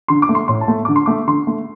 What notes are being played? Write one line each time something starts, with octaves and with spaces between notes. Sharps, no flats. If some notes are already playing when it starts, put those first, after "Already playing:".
D3 C6
D6
A3
C6
A2 C6
A5
A3
D3 D6
C6
A3 D6
D3 C6
A3